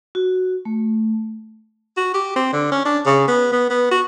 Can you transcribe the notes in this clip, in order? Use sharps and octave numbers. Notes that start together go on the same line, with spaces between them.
F#4
A3
F#4
G4
C4
D3
C#4
D4
C#3
B3
B3
B3
F#4